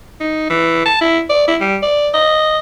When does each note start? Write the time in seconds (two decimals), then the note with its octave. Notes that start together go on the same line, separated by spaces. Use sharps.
0.20 D#4
0.50 E3
0.85 A5
1.01 E4
1.29 D5
1.48 E4
1.60 G3
1.82 D5
2.14 D#5